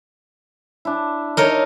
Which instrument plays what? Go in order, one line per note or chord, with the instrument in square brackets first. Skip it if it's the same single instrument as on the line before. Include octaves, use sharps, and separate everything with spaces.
[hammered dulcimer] D4 E4
[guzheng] D#4 A#4 C#5